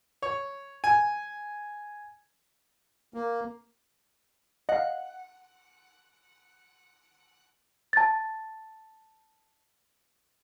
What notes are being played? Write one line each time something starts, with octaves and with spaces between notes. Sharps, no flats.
C#5
G#5
A#3
D#5 F5 F#5
A5 A6